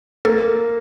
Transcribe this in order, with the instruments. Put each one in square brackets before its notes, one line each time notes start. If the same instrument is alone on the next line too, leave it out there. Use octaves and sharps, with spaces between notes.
[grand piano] A#3 [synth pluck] A4